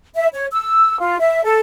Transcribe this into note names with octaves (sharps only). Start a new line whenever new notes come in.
E5
C#5
E6
F4
E5
A4